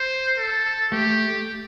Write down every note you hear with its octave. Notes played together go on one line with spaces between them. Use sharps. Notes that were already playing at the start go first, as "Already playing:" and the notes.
Already playing: C5
A4
A3 G4